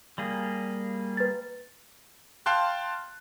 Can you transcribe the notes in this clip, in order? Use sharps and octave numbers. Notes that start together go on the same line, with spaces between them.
G3 A#3 G#4
B4 A6
F5 G5 A5 C6 F#6